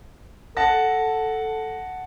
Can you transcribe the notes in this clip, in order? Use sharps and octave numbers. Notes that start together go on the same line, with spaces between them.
A4 F#5 A5 A#6